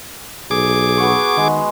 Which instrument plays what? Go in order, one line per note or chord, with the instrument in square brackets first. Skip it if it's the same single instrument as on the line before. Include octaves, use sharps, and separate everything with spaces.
[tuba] B1 [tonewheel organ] G#4 D6
[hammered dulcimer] B3 F#4 C#6
[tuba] D#3 [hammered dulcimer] G#3